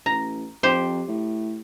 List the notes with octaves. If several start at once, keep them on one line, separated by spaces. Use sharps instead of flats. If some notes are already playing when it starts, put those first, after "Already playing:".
A1 A#5
F2 G4 C5
A2